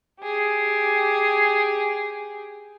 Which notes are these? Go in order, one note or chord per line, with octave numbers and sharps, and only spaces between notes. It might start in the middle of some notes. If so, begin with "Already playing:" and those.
G4 G#4